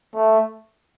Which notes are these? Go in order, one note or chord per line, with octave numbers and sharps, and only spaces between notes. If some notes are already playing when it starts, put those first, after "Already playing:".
A3